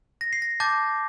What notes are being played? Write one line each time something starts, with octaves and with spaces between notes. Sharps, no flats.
A#6
C7
A#6
A5 D6 G6 A6